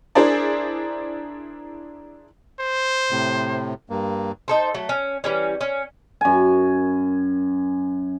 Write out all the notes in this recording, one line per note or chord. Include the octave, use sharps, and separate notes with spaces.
D4 E4 G#4 A#4 C5 D5
C5
A2 C3
G2 A#3
D#4 A4 C5
F#3 A3
C#4
E3 G3 C#4
C#4
F#2 G#5